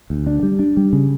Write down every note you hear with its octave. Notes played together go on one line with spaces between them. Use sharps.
D2
D4
G3
D4
G3
C#3